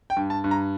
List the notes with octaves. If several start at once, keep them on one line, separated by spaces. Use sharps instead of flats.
G5
G2
A5
G2
A#5